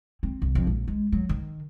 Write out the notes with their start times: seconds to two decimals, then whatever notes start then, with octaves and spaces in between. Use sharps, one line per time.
0.23 C4
0.42 C2
0.55 F2
0.67 A#1
0.88 G#3
1.12 F#3
1.29 D#3